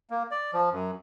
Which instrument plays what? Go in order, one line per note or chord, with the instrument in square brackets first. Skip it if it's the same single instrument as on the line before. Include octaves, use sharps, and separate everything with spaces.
[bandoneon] A#3
D5
F3
F#2